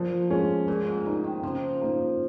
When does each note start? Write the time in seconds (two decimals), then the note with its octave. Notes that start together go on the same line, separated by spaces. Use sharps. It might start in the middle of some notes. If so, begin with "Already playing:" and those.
Already playing: A#2 F3
0.30 G#3 C#4
0.68 A#2 G#3
0.86 G#2
1.06 A#2 D#4 A#4
1.24 D#3
1.43 C#3 F3
1.81 A#3 D#4